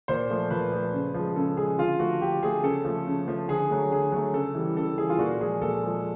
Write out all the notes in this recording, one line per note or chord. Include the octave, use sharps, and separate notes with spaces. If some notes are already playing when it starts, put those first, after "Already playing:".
A#2 C5
F3 A3
A#2 B4
F3 A3
C#3
F3
G#3
C#3 A4
F3 G#3 G#4
D3 F4
F3 A3 F#4
D3 G4
F3 A3 G#4
C#3 A4
F3 A3
C#3
F3 A3
D3 G#4
F#3 A3
D3 G#4
F#3 A3
C#3 A4
E3 G3
C#3 A4
E3 G3 G#4
F4
A#2 F#4
F3 G#3 G#4
A#2 A4
F3 G#3